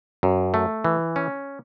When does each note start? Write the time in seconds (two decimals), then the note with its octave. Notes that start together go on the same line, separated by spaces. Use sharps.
0.23 F#2
0.54 A3
0.84 E3
1.16 C#4